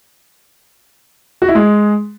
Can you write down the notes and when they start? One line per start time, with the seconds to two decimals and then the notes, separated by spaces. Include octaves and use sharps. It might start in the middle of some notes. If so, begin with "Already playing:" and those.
1.42 F#4
1.48 E4
1.55 G#3